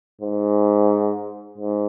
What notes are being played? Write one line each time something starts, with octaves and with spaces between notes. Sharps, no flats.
G#2
G#2